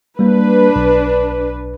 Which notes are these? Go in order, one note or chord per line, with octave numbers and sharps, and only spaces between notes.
G3 A#3 D4 B4
B1